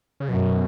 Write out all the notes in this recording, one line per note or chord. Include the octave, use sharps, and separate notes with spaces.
C#3
F#2 B2